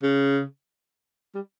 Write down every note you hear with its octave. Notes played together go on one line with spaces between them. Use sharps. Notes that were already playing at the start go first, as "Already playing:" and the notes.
C#3
G3